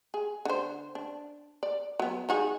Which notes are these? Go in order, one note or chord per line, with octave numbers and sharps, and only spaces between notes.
G#4
D3 C5
D4
D5
F#3 B3
D#4 F#4 G#4